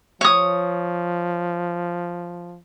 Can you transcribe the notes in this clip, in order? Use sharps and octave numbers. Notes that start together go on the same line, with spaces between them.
F3 C#5 D#6